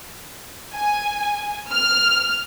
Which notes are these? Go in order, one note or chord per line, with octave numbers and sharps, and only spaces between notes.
G#5
F6